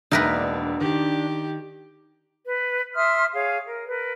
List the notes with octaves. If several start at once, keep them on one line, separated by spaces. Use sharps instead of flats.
E1 A#3 D4 D#4 A#4 B4 E5
D#3 G4
B4
E5 C6 D#6 F6
G#4 C#5 F5
A#4
A#4 B4